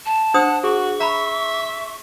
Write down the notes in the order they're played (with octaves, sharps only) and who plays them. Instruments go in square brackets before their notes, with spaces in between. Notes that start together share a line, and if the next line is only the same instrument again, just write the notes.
[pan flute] A5
[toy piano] D4 C5 D#6 [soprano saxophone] F#5
[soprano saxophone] F#4 [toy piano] G#4 [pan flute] C#6
[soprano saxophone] E5 [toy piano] A#5 B5